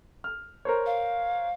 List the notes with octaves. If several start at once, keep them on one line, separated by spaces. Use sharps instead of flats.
F6
A#4 C5 C#5
F5